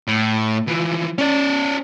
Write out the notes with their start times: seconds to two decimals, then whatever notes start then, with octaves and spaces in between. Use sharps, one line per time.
0.08 A2
0.68 E3 F3
1.18 C#4 D5